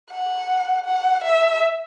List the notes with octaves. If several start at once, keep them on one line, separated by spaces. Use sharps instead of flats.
F#5
F#5
E5